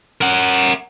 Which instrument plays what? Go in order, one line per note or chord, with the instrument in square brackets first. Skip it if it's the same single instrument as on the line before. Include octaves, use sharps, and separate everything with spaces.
[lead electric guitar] A#4 F#5